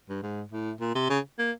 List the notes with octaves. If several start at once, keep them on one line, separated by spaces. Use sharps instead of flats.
G2
G#2
A2
A#2
C3
C#3
A#3